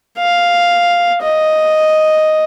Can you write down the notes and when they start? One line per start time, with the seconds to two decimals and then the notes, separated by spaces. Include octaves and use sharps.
0.18 F5
1.22 D#5